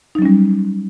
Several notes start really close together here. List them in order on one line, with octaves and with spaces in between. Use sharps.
D#4 F#3 C#4 G3